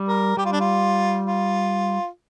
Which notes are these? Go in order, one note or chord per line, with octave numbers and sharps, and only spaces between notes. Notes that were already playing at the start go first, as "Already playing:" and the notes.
Already playing: G3
A#4
G3 G4
F4
D4
F4
F4